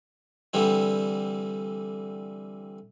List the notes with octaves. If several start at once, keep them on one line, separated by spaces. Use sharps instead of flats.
D3 E3 G3 C4 E4